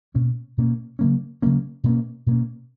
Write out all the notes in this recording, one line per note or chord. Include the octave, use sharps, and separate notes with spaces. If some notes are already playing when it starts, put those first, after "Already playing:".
B2 A#3 C#4
B2 A#3 C#4
C#3 F#3 A#3 C#4
C#3 F#3 A#3 C#4
B2 A#3 C#4
B2 A#3 C#4